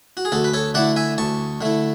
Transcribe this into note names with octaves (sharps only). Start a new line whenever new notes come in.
F#4
G#4
D2 F#4 A4
B4
A4 C#5
D3 A3 E4 D5 F#5
E5 G#5
D2 A5 C#6
D3 A3 E4